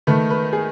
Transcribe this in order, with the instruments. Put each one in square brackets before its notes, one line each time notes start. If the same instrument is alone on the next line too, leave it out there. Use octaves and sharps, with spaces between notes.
[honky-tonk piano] D#3 A3 B4
B4
G#4